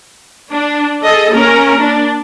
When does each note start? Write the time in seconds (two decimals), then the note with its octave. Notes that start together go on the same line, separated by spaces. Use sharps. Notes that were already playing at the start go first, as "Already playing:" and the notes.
0.51 D4
1.02 G#4 A4 D#5
1.33 A#3 C#4 A#4
1.80 D4